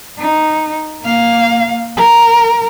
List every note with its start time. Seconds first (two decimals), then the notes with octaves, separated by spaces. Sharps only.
0.18 D#4
1.02 A#3 F5
1.97 A#4